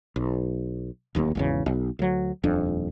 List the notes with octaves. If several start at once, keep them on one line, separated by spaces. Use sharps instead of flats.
B1
D1 D#2 F3 A#3
G#1 E2 C#3
B1
D2 F#3
D#1 F2 D4